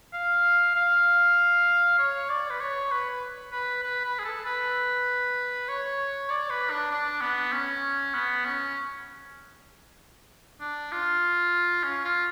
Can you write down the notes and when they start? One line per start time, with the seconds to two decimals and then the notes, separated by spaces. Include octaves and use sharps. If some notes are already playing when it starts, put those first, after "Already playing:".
0.13 F5
0.76 F5
1.99 C#5
2.29 D5
2.50 B4
2.60 C#5
2.91 B4
3.52 B4
3.84 B4
4.04 B4
4.19 G#4
4.25 A4
4.45 B4
5.68 C#5
6.30 D5
6.50 B4
6.70 D4
6.91 D4
7.21 B3
7.52 C#4
8.14 B3
8.45 C#4
10.61 D4
10.92 F4
11.83 C#4
12.04 F4